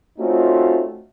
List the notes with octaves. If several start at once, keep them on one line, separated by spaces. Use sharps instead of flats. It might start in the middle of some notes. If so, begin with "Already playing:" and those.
A3 C4 C#4 D#4 F4 F#4